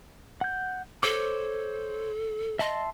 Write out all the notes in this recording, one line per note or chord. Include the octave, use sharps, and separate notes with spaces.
F#5 G6
A4 C5 C#5 D6
D#5 E5 A5 C6